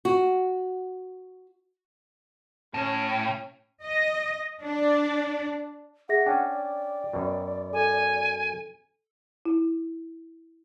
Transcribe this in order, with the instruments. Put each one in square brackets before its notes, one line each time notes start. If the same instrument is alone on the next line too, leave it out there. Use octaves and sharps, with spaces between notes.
[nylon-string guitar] F#4
[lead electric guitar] A2 [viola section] C#4
[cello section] D#5
D4
[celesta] G#4 E5 A#6 [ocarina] F#5
[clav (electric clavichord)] C#4 D4 [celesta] G5
[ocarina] D5
[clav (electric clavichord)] F#2 B2
[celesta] A4 [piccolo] G#5
[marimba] E4